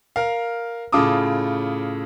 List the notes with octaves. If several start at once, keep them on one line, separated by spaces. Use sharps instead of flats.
A#4 F5
A2 C#3 F4 A5 D6 D#6